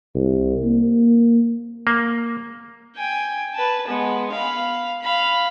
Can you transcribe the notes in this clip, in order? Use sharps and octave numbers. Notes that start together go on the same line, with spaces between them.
C2
A#3
A#3
G5 G#5
B4 A5
G#3 B3
F5 B5
F5 B5